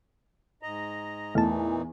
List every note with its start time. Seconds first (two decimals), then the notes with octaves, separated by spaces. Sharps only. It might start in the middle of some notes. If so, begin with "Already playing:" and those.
0.63 G#2 D#5 A#5
1.35 E2 A#2 E3 A3 D#4 A5